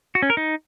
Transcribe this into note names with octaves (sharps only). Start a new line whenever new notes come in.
F#4
C#4
A#4
D#4